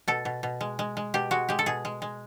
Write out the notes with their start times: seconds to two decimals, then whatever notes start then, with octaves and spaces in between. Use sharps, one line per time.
0.08 B2 A4
0.25 B2
0.43 B2
0.61 G#3
0.79 G#3
0.97 G#3
1.14 B2 G4
1.31 G#3 F#4
1.49 G#3 G4
1.59 A4
1.66 B2 G#4
1.85 G#3
2.02 G#3